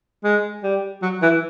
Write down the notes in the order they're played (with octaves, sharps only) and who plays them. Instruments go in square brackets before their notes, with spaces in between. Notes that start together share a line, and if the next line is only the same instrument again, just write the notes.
[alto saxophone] G#3
G3
F#3
E3